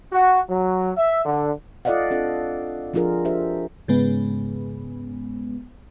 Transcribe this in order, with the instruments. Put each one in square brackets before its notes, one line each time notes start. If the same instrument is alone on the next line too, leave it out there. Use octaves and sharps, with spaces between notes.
[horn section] F#4
F#3
E5
D3
[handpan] F4 A4 D5 D#5 F5 F#5
C4 D4 F4 A4
F3 D4 F4 G#4 A#4
D4 G4 C5 E5
[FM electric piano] G#2 C#3 G#3 B3